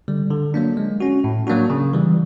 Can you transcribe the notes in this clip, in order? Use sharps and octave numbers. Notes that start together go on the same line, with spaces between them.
D3 G3
D3
F#3 A#3 D4
G#3
C#4 F#4
A2
F#3 A#3 D4 F#4
C#3
E3 G3